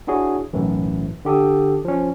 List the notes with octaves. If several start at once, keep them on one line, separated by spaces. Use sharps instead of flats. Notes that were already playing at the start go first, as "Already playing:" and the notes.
D4 E4 F#4 G#4 C#5
B1 F#2 A2 E3
D3 G4 A4 D#6
F3 C#4